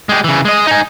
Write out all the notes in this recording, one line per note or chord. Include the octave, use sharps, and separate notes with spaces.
G#3 G4
C#3 E3
G#3 D#5
D#4 G#5